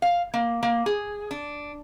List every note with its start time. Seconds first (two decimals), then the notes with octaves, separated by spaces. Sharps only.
0.02 F5
0.34 A#3
0.63 A#3
0.86 G#4
1.31 D4